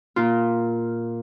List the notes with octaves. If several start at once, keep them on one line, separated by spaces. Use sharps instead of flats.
A#2 F4